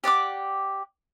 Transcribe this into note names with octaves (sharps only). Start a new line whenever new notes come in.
G4 D5 F#5 D6